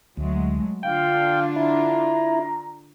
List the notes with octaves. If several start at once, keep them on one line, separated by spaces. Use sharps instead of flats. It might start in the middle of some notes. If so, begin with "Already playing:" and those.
D2 F#3 G#3 A3
D3 D4 F4 F5 G5
E4 A#5